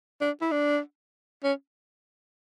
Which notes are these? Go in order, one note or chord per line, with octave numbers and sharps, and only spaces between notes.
D4
E4
D4
C#4